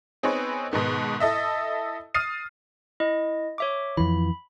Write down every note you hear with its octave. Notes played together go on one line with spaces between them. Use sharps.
B3 C4 D#4 G#4 B4 C#5
G#2 B2 D#3 B3
E4 A4 D#5 E5
D#6 F6 A6 C7 D#7
E4 D#5
C#5 E5 D6
F2 E3 B5